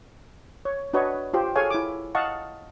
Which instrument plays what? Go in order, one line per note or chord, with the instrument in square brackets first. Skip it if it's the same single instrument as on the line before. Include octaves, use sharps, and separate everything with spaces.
[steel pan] C#5
D4 F#4 B4 C#5 D#5
F4 G4 C5
G#4 A4 C#5 F5 G#5
E4 D6
D#5 F5 F#5 A5 C#6